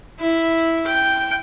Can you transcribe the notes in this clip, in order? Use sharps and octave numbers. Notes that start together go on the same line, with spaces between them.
E4
G5